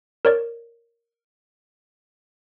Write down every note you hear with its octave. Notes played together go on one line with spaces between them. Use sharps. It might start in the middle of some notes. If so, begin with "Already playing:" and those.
A#4 C#5 D5